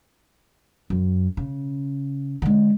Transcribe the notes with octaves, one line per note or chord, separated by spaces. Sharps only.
F#2
C#3
D3 G#3